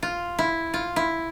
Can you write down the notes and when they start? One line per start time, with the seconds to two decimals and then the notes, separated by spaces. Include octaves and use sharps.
0.03 F4
0.39 E4
0.74 F4
0.96 E4